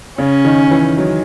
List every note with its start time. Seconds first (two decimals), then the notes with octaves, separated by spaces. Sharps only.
0.18 C#3 C#4
0.45 D#3
0.71 E3
0.98 F#3